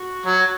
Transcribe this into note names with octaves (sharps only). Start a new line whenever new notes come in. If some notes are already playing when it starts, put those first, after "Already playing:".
Already playing: F#4
F#3